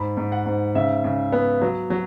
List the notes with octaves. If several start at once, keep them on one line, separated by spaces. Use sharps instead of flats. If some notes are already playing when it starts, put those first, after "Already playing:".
Already playing: G#2 B5
G#2
F#5
G#2
C#3 E5
C#3
B3
F#3
F#3